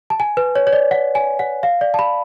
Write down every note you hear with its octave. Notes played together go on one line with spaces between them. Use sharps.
A5
G#5
B4
C#5
C#5
D5
F#5
G#5
F#5
F5
D5
A5
B5